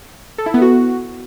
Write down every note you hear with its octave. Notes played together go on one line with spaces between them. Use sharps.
A4
E4
B3
F#4